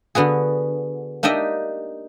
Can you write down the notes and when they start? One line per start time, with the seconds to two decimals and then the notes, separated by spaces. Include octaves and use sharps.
0.15 D3 B3 F#4 G#4
1.23 A#3 D4 D#4 G4 D#5 E5